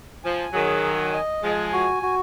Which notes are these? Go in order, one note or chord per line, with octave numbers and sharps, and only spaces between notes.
F3 G#5
D#3 F#3 G#4
G#5
D#5
F3 G#3 G#5
F#4
F#4